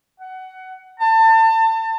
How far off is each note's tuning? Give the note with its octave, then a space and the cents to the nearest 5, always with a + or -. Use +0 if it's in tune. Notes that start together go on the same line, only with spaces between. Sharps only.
F#5 +20
A5 +30